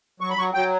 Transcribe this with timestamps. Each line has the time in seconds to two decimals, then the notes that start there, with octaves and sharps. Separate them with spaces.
0.20 F#3 C#6
0.30 B5
0.37 F#3 C#6
0.54 F#3 G5